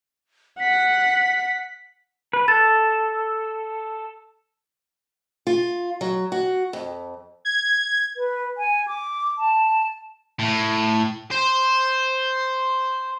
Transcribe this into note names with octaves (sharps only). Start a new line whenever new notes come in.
F#5 B6
B4
A4 A6
F4
F#3
F#4
F2
G#6
B4
G#5
D6
A5
A2
C5